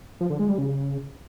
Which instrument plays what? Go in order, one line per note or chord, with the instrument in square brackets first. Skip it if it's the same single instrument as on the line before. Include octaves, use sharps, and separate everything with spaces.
[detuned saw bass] F3
D3
G#3
G3
C#3